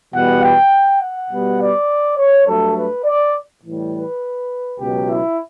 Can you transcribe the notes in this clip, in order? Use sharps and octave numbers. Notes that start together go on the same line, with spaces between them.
E2 B2 G3 B3 F#5
G5
F#5
B2 G3 B3
D5
C#5
G2 F#3 A3 A4
B4
D5
A2 E3 G3
B4
C#2 B2 F#3 G4
E4